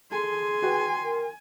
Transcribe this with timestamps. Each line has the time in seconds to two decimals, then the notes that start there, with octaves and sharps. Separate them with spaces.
0.12 G#4 A4 G#5 C6
0.62 F#4 B4 G5
1.03 A#4